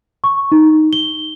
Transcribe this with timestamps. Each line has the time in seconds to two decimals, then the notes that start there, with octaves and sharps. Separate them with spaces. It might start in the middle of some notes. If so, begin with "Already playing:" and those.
0.24 C#6
0.52 D#4
0.93 G7